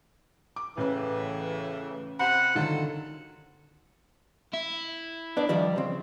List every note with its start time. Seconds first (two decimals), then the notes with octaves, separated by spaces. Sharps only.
0.56 D6
0.77 A1 A2 C#3 E3 B4
2.19 C3 C5 F#5 B5
2.55 D3 D#3 F#3 F4 A4
4.53 E4
5.37 B3 D4 D5
5.49 D#3 F3 G3
5.76 C#3 C4